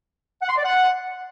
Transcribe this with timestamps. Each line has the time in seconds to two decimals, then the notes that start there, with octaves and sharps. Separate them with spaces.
0.42 F#5
0.49 C6
0.57 D5
0.64 F#5